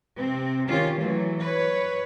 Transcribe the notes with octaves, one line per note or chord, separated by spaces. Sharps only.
C3 C4
D#3 C#4 F4 G4
E3 F#3 A3
B4 C#5